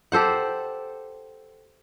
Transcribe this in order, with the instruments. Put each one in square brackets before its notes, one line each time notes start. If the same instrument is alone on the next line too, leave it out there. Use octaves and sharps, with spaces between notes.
[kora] G4 A4 C5 F#5